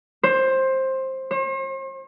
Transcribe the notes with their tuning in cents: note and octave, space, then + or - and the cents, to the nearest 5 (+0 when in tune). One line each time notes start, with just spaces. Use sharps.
C5 +15
C5 +45